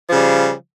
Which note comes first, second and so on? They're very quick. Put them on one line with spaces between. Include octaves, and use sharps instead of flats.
F3 C#3 G3